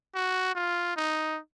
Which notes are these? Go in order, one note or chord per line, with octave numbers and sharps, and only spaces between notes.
F#4
F4
D#4